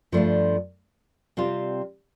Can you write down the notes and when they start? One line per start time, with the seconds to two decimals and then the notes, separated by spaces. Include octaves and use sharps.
0.12 G2 F3 A3 D4 F4
1.37 C3 G3 C4 F4